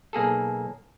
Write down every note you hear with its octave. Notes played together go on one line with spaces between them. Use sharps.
B1 A#3 G#4 A4